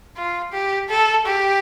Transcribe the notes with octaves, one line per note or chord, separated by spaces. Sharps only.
F4
G4
A4
G4